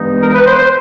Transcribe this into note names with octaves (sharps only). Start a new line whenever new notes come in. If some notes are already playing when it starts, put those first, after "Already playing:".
Already playing: G2 E3 G#3 B3 D#4
A#4
B4
C5
C5